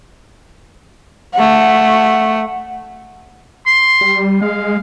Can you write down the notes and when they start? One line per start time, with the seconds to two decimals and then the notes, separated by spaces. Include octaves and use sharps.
1.34 A3 F#5
3.66 C6
4.01 G3
4.41 G#3 F5